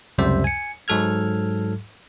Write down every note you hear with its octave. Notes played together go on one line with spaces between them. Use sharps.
C#2 F#2 C3 G3 C5 E5
G#5 C#7
G#2 F#3 A4 F6 G#6